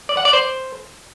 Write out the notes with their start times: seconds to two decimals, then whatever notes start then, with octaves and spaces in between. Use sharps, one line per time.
0.09 D5
0.17 F#5
0.25 D5
0.33 C5